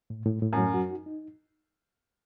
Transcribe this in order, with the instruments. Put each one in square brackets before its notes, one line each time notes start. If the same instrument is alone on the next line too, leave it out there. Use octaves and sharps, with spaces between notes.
[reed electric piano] A2
A2
A2
[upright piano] F#2
[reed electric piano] F#3
F#4
D#4
D#4